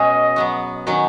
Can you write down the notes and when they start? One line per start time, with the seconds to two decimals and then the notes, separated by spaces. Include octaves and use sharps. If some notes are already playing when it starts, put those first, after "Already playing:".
Already playing: B2 G#3 C#4 G#4 D#5
0.36 F#3 B3 F#4
0.87 D#3 F#3 C#4 F#4